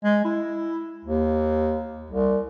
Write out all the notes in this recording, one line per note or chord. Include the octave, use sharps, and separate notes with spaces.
G#3
E4
D#2
C2